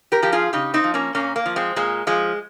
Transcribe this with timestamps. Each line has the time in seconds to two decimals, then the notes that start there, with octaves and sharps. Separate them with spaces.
0.12 G4 A#4
0.22 F3 G4
0.32 F4 G#4
0.53 C#3 D#4 G4
0.74 C4 D#4
0.84 F3
0.94 A#3 C#4
1.15 A#2 A#3 C#4
1.36 A#3
1.46 F3
1.56 G#3 C4
1.76 A#2 G#3
2.07 F3 G#3